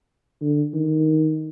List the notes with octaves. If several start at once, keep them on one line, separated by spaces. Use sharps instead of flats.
D3
D#3